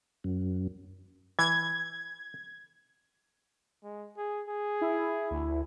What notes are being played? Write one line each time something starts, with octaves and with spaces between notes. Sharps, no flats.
F#2
E3 G#6
G#3
G#4
G#4
E4
D2